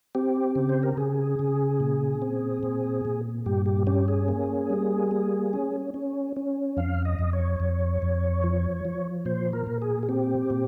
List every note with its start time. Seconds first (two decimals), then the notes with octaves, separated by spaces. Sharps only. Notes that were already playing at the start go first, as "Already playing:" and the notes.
0.15 C4 G4
0.55 C#3
0.69 C5
0.83 A#4
0.97 C#3 G#4
1.39 C#3
1.80 A#2
2.22 C4
2.63 A#2
3.05 A#2
3.46 G2 G4
3.66 G4
3.87 C#4 G4
4.08 G#4
4.28 A#3
4.70 G3
5.11 A#3
5.53 C#4
5.94 C#4
6.36 C#4
6.77 F2 F5
7.05 D#5
7.19 F2
7.33 C#5
7.60 F2
8.02 F2
8.44 F3
8.85 F3
9.25 A#2 C5
9.53 A#4
9.67 A#2
9.82 G#4
10.03 G#4
10.09 C4 G4
10.50 A#2